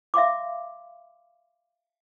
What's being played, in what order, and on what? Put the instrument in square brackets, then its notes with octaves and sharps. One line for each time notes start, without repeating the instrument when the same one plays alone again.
[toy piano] E5 F5 C6 D6